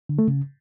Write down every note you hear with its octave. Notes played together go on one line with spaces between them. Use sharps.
D3
A3
C#3